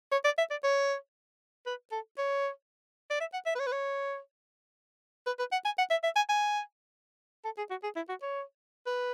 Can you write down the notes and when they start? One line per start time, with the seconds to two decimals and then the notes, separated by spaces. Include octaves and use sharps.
0.12 C#5
0.24 D5
0.38 E5
0.50 D5
0.63 C#5
1.66 B4
1.92 A4
2.18 C#5
3.10 D5
3.20 E5
3.33 F#5
3.46 E5
3.55 B4
3.59 C#5
3.67 B4
3.72 C#5
5.26 B4
5.39 B4
5.52 F#5
5.65 G#5
5.78 F#5
5.90 E5
6.03 E5
6.16 G#5
6.29 G#5
7.44 A4
7.57 G#4
7.70 F#4
7.83 G#4
7.96 E4
8.09 F#4
8.22 C#5
8.86 B4